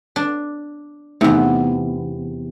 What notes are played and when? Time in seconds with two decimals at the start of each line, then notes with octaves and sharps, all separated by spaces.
0.16 D4
1.21 E2 C3 A3 D#4